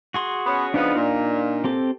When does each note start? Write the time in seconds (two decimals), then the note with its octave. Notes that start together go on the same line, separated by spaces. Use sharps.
0.14 F#4 G#4 C6
0.47 B3 C#4
0.74 C#3 F3 B3 D4 D#4 F5
0.95 A#2
1.64 C4 G4 A4